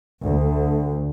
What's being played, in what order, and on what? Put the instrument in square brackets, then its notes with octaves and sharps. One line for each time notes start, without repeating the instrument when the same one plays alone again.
[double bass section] D2